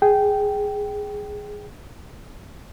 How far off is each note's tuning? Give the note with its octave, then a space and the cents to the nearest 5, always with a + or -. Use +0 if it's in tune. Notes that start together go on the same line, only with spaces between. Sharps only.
G#4 +0 G5 -15